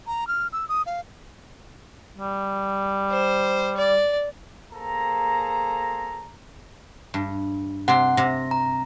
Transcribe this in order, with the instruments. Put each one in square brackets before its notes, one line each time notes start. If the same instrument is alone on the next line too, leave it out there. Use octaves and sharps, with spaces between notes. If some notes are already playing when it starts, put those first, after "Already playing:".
[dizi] A#5
F6
E6
D#6
F5
[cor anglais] G3
[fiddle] C5
D5
[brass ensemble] A#3 G#4 A4 C5 A#5
[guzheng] G2
[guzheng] C3 C4 [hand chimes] F#5
[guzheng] C3 [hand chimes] A#6
[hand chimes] A#5